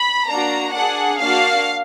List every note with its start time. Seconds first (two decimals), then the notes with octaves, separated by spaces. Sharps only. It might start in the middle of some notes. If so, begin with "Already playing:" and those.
Already playing: B5
0.27 A#3 D4 F#4 A#5
0.73 D4 G#4 F#5
1.20 A#3 D4 F#4 F5